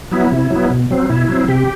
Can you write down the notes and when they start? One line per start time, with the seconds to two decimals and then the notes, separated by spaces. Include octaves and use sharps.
0.11 F#3 B3 E4
0.32 C3
0.51 F#3
0.56 B3
0.71 B2
0.91 F#3 C4
1.09 B2 E4
1.28 F#3 C4
1.48 C3 G4